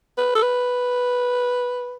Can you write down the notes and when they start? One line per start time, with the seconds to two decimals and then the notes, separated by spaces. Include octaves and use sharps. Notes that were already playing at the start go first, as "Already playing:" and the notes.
0.18 B4
0.35 A4
0.42 B4